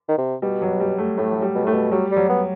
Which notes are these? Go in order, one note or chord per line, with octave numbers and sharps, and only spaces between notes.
D#3
C3
B2 G3
F#3
G3
A3
A2 A3
F#3
G3
B2
A2 A3
B2
F#3 G3
G3
F#3
B3